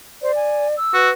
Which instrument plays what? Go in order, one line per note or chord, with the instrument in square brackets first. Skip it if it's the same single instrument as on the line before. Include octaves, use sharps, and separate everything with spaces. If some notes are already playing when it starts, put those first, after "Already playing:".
[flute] C5 [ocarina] D5
[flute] G#5
E6
[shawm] F#4 [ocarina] B4